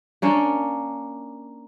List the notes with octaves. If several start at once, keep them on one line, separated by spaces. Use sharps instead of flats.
A#3 C#4 D4